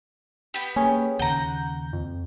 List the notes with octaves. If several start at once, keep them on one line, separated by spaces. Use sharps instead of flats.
B3 G4
A#3 C#4 G#4
D#2 C#3 F#5 A#5 G6
F2